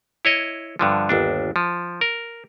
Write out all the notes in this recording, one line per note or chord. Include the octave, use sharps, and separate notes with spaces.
E4 C#5 D#5
G2 D3 F3
G1 D#2 D4
F3
A#4